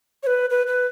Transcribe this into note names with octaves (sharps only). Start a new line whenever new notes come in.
C#5
B4
B4
B4